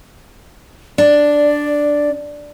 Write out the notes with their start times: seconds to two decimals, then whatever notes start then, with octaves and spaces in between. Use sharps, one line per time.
0.98 D4 D5